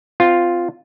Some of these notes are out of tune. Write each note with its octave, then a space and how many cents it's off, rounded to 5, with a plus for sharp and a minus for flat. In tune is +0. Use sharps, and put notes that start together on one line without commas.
C4 -15 F4 +0